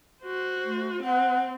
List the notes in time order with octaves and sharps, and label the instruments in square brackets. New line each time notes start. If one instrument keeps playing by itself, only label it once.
[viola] F#4 C5
[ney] A3
[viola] C4 [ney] F#5